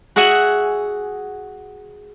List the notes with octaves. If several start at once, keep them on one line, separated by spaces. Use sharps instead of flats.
F#4 G#4 E5 F#5 G#5